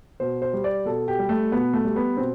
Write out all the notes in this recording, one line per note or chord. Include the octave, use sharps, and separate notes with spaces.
B2 C5
C5
G3
D5
B2 A4
G4
G3
A3
B2 B3
A3
G3
B3
B2 C4